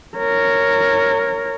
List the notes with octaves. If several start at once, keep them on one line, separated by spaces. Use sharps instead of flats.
A#4 C#5